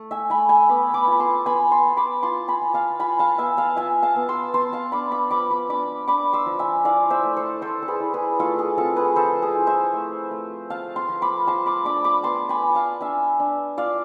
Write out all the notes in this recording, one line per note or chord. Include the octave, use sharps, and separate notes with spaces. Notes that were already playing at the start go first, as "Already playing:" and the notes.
Already playing: A3
E5 G#5
A3 G#5 B5
G#5 B5
B3 B5 D6
B5 D6
F4 B5
A5 C6
B3 G#5 B5
A5 C6
B3
B5 D6
F4 A5 C6
G#5 B5
F4
F5 A5
F4 G#5 B5
F5 A5
B3 E5 G#5
F5 A5
F4 E5 G#5
F5 A5
B3
C6 E6
B3 A5 C6
F5 A5
D4 B5 D6
B5 D6
F3 B5 D6
B5 D6
D4 B5 D6
D4 B5 D6
C6 E6
F3
E5 G#5
E4 D5 F5
C5 E5
A3
A4 C5
A3 A4 C5
A4
G#4 B4
E4
G#4 B4
A3 F4 A4
G#4
C4 F4 A4
G#4 B4
F3 A4 C5
G#4
E4
C5 E5
A3
A3
F4 F5 A5
A5 C6
F3
B5 D6
F3 A5 C6
B5 D6
D4 B5 D6
B5 D6
B3 A5 C6
G#5 B5
F4
F5 A5
D4 E5 G#5
D4
F4 D5 F5